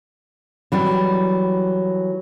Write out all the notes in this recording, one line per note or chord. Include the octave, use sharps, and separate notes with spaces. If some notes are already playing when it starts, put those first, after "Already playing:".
E3 F#3 G3